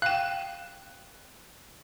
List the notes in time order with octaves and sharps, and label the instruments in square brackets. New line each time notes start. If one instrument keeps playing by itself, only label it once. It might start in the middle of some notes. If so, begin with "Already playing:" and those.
[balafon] F5 G5 [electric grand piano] F#6 E7